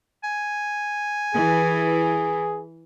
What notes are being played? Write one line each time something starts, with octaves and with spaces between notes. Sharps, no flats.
G#5
E3 G#4